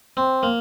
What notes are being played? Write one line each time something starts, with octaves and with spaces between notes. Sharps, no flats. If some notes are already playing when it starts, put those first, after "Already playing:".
C4
A#3